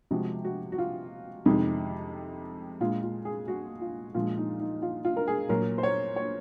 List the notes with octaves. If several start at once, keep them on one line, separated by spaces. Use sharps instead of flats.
C3 F3 G#3 F#4
F#4
F#4
F4
F2 C3 D#3 G#3 D#4
A#2 G#3 F4
F4
G#4
F#4
F4
A#2 F3 G#3 F4
D#4
D#4
F4
F4
A#4
G#4
A#2 F#3 A#4
C5
C#5
C#5